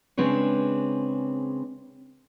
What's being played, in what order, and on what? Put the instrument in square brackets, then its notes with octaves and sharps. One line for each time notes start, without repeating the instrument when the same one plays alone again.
[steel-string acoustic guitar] C#3 G#3 C4 D4 B4 C#5